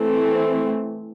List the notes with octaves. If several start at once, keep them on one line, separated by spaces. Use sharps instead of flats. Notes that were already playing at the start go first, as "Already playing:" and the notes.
Already playing: E3 A3 C4